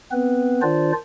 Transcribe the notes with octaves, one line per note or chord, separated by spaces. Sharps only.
B3 C4 B4
D#3 D4 F4 C5 D5